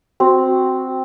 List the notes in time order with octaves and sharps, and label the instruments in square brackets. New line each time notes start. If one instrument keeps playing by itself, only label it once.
[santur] C4 [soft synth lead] F#4